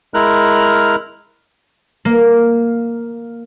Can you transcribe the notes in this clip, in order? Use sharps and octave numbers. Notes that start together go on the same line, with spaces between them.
G#3 E4 A#4 F6 F#6
A#3